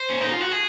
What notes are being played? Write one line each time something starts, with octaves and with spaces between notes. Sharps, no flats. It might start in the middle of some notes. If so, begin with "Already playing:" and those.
Already playing: C5
C#4
D#4
F4
F#4
G#4